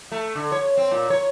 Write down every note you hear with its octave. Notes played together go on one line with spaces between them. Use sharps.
A3
D3
C#5
C4
A#2
C#5